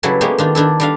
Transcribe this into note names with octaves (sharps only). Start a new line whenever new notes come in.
C#3 F#3 G3 E4 A4 B4
G3 G#3 A#3 B3 C#4 G4
D#3 D4 F4
D#3 D4 E4 A4
G3 D4 F5